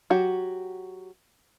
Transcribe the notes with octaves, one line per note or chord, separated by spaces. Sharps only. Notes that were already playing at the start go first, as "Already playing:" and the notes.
F#3 F#4 G4